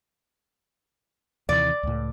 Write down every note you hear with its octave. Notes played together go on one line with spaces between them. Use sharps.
D#2 C3 E3 D5
C#2 A2